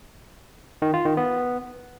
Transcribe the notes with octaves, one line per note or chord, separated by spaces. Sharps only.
D#3
F4
D#3
B3